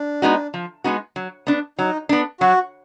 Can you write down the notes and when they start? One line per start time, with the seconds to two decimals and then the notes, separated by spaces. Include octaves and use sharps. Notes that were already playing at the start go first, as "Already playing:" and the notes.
Already playing: D4
0.22 G#3 B3 D#4 F#4
0.54 F3
0.84 G#3 B3 D#4 F#4
1.16 F#3
1.47 B3 D4
1.79 F#3 D#4
2.09 B3 D4
2.40 F#3 F#4